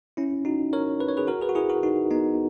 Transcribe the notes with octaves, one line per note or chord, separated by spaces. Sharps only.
C#4 E4
D#4 F#4
A#4 C#5
B4
C#5
G#4 B4
F#4 A#4
G#4 B4
F#4
E4 G#4
F#4 A#4
D#4 F#4
B3 D#4